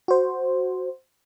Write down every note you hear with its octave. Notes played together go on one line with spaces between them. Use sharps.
F#4 C5